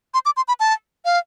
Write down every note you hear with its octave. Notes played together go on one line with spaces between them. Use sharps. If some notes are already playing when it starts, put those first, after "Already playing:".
C6
D6
C6
B5
A5
F5